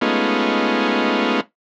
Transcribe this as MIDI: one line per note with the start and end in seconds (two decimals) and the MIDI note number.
0.01 1.41 56
0.01 1.41 57
0.01 1.41 59
0.01 1.41 61
0.01 1.41 63
0.01 1.41 65